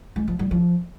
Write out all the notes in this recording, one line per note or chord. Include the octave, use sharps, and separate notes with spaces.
G#3
F3
G3
F3